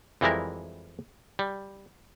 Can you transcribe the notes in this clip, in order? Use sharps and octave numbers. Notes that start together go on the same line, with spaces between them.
F2 E3 G3 G#3 E4 A#4
G3